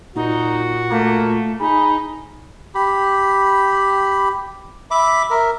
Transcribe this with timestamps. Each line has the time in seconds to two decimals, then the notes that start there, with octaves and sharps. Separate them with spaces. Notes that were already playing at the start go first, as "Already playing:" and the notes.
0.16 A#2 D#4 F#4
0.91 A3 A#3
1.60 D#4 G#4 B5
2.75 G4 B5
4.91 E5 B5 D6
5.30 A#4 E5